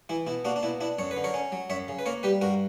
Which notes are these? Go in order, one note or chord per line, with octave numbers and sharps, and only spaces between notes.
E3 E4
B2 E4
A#3 D4 F#4
D4
B2 E4
D4 E4
F#2 C#5
B4
D3
A#4 C#5
C#4
F#3
F#2 C#5 E5
C#3
B4
A#3 A#4 C#5
G3 G4 B4
G2 F#4 A#4